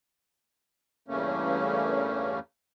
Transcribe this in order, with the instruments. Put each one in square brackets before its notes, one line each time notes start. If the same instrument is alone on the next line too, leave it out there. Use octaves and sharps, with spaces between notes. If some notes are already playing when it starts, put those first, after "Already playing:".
[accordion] E2 G2 C#3 A3 A#3 C#4